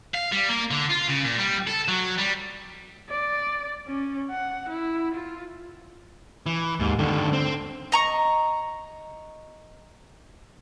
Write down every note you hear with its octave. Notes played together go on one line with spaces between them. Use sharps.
F5
G3
A#3
D3
F4
C#3
A#2
G3
A4
F#3
G3
D5
C#4
F#5
E4
F4
E3
D#2 G#2
G2 D3 D#3
C4
D#5 A#5 C#6